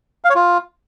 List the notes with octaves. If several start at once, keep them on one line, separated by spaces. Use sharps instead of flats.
F5
C#5
F4